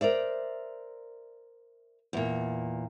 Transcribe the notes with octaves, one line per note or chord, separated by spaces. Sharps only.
A#4 C5 D5 E5
E2 A#2